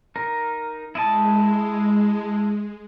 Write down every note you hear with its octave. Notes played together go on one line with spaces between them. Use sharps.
D#4 A#4
G#3 E4 D#5 A5